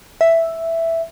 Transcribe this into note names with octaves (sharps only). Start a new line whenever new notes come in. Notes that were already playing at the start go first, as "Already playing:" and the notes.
E5